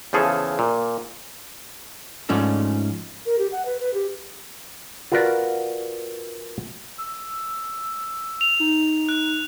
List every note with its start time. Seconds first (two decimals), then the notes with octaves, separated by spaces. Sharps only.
0.13 E2 C#3 F3 G#4 A4
0.59 A#2
2.29 G#2 F3 A3 C#4 D4
3.26 A#4
3.38 G4
3.52 F#5
3.65 B4
3.79 B4
3.93 G4
5.12 F4 F#4 A#4 B4 D5
6.98 E6
8.41 F7
8.60 D#4
9.09 F#6